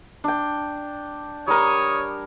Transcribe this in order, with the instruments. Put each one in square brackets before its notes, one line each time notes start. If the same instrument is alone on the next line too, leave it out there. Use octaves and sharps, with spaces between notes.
[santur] D4 G5
[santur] G3 A#4 [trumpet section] C#5 D#6